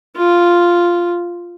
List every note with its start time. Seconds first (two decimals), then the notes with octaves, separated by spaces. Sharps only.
0.16 F4